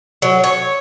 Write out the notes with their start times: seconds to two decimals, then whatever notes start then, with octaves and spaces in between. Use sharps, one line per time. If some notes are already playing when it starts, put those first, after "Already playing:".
0.22 F#3
0.44 C#5